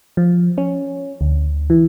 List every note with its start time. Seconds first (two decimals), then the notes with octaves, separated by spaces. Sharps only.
0.17 F3
0.58 C#4
1.21 D2
1.70 E3